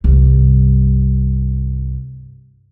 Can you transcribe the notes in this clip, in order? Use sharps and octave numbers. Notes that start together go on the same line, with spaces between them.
C2 G2